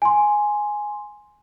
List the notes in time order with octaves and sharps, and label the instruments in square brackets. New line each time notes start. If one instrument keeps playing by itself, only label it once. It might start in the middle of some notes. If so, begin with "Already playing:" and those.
[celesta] G#5 C6